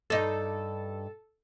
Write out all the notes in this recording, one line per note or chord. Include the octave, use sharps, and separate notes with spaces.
G2 D#4 A4